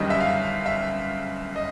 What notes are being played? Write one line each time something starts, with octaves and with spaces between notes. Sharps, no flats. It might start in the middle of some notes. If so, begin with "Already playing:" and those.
Already playing: G1 F#2 D#3 G3 D#5
E5
F5
E5
D#5